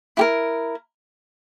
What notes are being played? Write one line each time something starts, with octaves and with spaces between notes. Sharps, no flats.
E4 G4 A#4